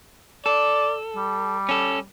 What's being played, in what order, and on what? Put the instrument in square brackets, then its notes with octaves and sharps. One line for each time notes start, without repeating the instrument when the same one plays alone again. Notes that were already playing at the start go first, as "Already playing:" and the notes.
[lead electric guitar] A4 [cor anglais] D5
[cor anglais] G3
[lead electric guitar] C#4 A4